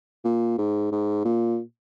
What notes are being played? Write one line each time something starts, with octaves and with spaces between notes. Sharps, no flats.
A#2
G#2
G#2
A#2